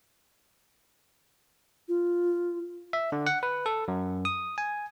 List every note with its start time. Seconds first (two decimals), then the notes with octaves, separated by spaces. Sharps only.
1.88 F4
2.93 E5
3.12 D3
3.27 F#5
3.43 B4
3.66 A4
3.88 F#2
4.25 D#6
4.58 G#5